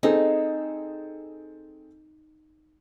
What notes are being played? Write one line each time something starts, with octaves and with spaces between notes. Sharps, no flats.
C4 D#4 G#4 A4